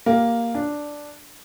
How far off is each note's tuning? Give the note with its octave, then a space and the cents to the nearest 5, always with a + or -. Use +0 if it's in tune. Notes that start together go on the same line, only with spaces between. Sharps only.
A#3 +0 G4 +0
D4 +0 D5 +0